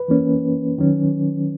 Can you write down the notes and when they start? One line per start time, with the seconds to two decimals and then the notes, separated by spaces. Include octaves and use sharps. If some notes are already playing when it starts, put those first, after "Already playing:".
Already playing: B4
0.08 E3 A#3 C#4
0.78 D#3 F#3 C#4